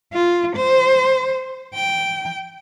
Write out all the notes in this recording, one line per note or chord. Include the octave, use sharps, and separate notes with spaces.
F4
C5
G5